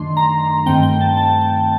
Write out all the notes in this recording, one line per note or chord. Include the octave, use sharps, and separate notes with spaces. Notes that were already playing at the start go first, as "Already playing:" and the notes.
Already playing: F#2 D#3 A3 D4 C6
A#5
G2 D#3 A3 C4 G5
G5
A5
A5
A5